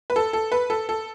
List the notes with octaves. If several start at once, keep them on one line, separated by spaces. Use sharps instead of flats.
B4
A4
A4
B4
A4
A4